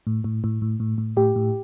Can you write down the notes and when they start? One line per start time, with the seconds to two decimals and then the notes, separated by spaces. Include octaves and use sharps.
0.07 A2
0.24 A2
0.44 A2
0.62 A2
0.80 A2
0.98 A2
1.17 A2 G4
1.36 A2